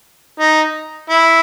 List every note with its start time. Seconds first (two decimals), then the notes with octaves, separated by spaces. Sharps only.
0.40 D#4
1.10 E4